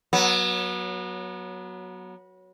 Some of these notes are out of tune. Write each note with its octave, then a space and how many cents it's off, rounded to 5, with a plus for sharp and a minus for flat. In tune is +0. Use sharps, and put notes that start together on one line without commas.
F#3 +0 B3 -30